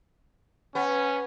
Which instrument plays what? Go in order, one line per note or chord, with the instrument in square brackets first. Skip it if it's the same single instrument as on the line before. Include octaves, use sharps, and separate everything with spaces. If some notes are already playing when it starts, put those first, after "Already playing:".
[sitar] B3 [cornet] C#4